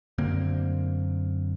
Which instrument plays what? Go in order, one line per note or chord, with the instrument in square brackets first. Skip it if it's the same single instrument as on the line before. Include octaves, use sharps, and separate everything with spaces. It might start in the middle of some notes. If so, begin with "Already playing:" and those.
[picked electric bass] F#2 D3 A#3 C4